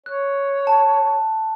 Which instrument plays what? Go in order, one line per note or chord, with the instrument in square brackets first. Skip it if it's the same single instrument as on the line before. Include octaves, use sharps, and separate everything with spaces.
[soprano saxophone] C#5 [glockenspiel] F#6
[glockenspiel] A5